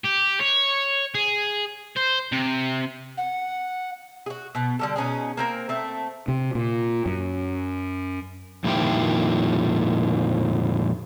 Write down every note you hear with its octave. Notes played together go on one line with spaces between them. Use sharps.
G4
C#5
G#4
C5
C3
F#5
F#4 G#4
B2 B3
D3 G3 A4
B2 C#4 D#4 G#4
A#3 C4 A#4
A3 C4
C3
A#2
F#2
F2 A#2 D#3 E4 G4 G5